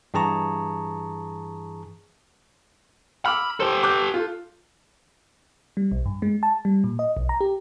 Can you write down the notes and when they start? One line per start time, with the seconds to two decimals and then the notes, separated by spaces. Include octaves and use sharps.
0.14 G2 E3 G#4 A5 A#5 C#6
3.26 B5 D6 E6 F6
3.60 G4 A4 C5
3.83 D6 F#6 G6
4.14 F4 A4
5.77 G3
5.92 B1
6.06 G2
6.22 G#3
6.43 A5
6.65 G3
6.84 A#2
6.99 D#5
7.17 B1
7.29 A#5
7.41 G4